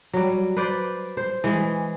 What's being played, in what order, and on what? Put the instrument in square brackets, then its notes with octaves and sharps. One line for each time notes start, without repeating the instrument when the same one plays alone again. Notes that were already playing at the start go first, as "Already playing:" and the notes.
[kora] F#3 G3
B4 C5 D5
C5
E3 G#3